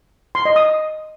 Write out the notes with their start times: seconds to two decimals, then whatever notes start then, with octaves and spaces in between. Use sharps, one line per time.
0.35 C6
0.45 D#5
0.56 D#6